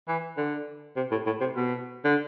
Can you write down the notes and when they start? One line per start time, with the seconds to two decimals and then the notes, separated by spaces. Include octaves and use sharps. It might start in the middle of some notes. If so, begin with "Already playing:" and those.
0.08 E3
0.37 D3
0.97 C3
1.11 A2
1.26 A2
1.41 C3
1.56 B2
2.04 D3